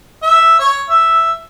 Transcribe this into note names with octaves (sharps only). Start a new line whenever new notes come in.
E5
C#5
E5